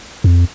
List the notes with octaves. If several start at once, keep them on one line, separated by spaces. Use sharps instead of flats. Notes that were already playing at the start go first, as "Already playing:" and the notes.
F2